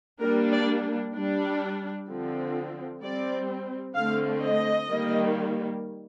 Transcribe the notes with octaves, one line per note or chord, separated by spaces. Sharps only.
G3 A#3 D4 A#4
D5
G3 D4
D3 F3 C4
G3 C4 D5
D3 A3 C4 F5
D#5
D#3 G3 A#3